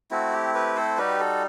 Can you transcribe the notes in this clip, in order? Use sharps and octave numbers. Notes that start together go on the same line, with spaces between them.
A3 C4 E4 F#4
G4
G4 B4
A4 C5
G3 D#4 F#4 G4 B4
F#4 A4